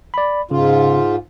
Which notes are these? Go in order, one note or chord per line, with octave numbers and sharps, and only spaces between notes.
D5 B5
G#2 C#3 F4